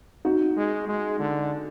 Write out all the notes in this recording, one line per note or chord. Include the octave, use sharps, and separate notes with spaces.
D#4 F#4
G#3
G#3
D3